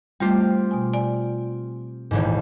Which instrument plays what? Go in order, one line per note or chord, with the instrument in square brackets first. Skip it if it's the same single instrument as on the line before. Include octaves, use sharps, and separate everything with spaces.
[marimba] G3 A3 [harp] C4 F4 G4
[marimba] B2 G#5
D5 G#5
[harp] D#1 A1 G#2